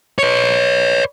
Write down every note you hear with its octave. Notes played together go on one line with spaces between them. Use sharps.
B4 C#5